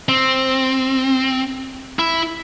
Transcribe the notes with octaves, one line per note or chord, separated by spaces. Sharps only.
C4
E4